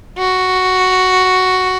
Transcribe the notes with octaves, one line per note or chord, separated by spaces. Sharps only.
F#4